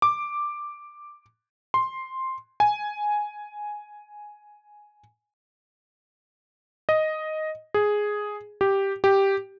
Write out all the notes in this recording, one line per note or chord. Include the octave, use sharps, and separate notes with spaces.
D6
C6
G#5
D#5
G#4
G4
G4